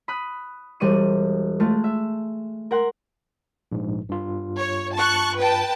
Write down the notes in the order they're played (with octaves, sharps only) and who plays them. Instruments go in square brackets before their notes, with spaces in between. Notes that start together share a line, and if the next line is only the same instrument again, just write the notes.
[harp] B5 D#6 F#6
E1 G3 D5 C#6 C#7 D#7
G#3 A3 F4
E5
A#4 F#5 C6
[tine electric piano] A#1 G#2
G2 F4
[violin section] C#5
A5 C#6 F#6
B4 G5 A5